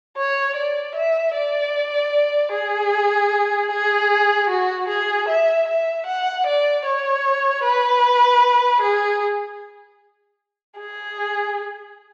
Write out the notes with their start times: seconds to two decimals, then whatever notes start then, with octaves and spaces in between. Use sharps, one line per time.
0.17 C#5
0.55 D5
0.95 E5
1.34 D5
2.52 G#4
3.71 G#4
4.50 F#4
4.88 G#4
5.28 E5
5.68 E5
6.06 F#5
6.46 D5
6.85 C#5
7.63 B4
8.81 G#4
10.78 G#4